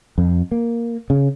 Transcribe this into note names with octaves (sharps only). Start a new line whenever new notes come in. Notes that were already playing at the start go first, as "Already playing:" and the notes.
F2
A#3
C#3